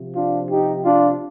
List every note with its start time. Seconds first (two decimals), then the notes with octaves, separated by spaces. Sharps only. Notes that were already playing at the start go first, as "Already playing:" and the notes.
Already playing: C3 F3
0.16 D4 F4
0.50 D#4 G4
0.85 D4 F4